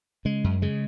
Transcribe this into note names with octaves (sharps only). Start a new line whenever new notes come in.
C#3 G#3
F#2
C#3 G#3